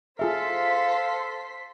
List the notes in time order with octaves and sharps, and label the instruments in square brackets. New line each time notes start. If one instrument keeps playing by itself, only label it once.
[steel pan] F4 G#4 E5 [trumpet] A4 [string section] C5 C6 B6 [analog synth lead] F5